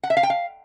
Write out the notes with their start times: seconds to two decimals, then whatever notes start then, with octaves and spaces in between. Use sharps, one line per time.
0.03 F#5
0.10 E5
0.17 F5
0.23 G5
0.30 F5